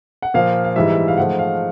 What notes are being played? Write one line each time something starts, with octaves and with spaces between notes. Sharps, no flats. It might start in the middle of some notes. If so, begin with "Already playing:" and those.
F#5
A#2 F3 A#3 F5
F5
G#2 E3 G3 E5
F5
G#2 F3 A3 F#5
F5